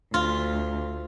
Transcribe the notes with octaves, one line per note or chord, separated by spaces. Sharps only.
D2 F4